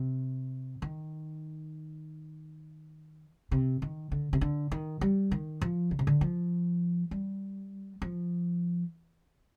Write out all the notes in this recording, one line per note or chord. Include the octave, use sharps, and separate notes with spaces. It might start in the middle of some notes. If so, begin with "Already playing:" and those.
Already playing: C3
D#3
C3
D#3
D3
C3
D3
D#3
G3
D#3
F3
D3
C3
D3
F3
G3
F3